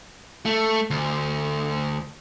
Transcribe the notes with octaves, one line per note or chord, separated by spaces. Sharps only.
A3
D2